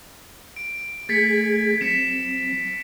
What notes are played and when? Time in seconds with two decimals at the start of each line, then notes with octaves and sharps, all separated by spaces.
0.56 D7
1.09 A3 G#4 G#6 A6 B6 C#7
1.81 F#3 C4 B6 C#7 E7